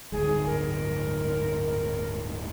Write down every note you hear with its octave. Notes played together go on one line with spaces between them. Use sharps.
D1 G1 G#2 G#4
A#4